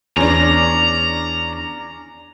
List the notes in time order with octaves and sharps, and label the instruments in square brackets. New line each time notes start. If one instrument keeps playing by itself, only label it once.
[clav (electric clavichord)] E2 [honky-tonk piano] C#4 D4 [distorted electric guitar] A#5